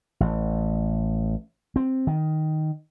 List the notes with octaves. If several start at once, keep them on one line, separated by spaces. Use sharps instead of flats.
A1
C4
D#3